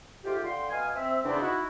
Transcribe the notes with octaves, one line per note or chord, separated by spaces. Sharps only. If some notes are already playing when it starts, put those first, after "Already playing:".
G#2 A3 F4 G4
D3 F5 G5 C6
B2 D#5 F5 G#5
C4 E5
E2 G#2 C#3 B3 C4 D4
D#4 E4 F#4